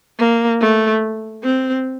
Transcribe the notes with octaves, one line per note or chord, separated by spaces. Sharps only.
A#3
A3
C4